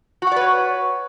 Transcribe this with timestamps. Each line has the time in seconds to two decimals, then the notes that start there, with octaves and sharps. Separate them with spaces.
0.22 F#4
0.27 F#5
0.32 D5
0.36 B4
0.41 C#5